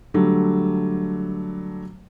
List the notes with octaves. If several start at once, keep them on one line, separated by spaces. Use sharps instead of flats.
D3 F#3 G3 A3